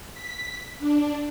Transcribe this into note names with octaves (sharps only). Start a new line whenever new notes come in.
B6
D4